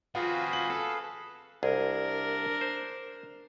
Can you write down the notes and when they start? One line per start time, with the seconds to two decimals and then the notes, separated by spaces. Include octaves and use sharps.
0.15 C4 F4 F#4 G#4 B4 F5
0.53 F#7
0.70 A4
1.63 C2 D4 G#4 A#4
2.61 C5